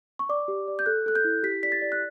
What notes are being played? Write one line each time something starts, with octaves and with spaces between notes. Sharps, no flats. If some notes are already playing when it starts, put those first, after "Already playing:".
C#6
D5 D6
G4
D5
G6
A4 F#6
A4 F#6
G6
E4
G4 B6
D5 B6
A6
D5
F#6